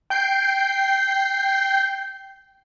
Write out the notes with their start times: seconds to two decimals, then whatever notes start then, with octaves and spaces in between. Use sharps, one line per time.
0.10 G5 G6 C7